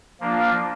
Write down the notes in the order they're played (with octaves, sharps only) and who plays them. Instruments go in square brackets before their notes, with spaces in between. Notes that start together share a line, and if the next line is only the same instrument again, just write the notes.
[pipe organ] F3 A#3 D4 F4